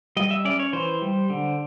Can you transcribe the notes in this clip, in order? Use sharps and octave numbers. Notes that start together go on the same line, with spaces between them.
G3 D#5
E5
C#4 D5
C#5
E3 C5
G3
D3